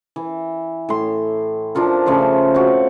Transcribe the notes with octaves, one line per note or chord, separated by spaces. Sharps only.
E3
A2 C6
F3 D4 F4 A#4
C#3 F3 A3 C5
C4 F#4